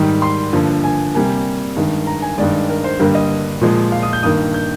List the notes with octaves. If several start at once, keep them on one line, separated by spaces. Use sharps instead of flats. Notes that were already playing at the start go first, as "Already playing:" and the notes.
Already playing: G#2 D#3 G3
C6
G2 D3 F3 A#3
G#5
C3 G3 A#3 G#5
G2 D#3 G#3
A#5
G#5
G2 D#3 G#3 D5
A#4
C5
G2 D3 G3 A#3 A#4
D#5
A#2 F3 G#3
F5
D#6
G6
G2 D#3 A#3 D#6
G6